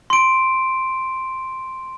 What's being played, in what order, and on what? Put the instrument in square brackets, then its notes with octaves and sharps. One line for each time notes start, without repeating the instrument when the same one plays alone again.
[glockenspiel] C6 D7